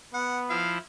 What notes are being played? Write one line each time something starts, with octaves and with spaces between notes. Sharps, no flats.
B3 F#5
F3 E4 F5